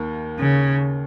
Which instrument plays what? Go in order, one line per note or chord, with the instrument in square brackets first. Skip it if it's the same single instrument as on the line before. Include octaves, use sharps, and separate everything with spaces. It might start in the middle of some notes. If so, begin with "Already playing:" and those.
Already playing: [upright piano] D#2 D#3 A#3
[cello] C#3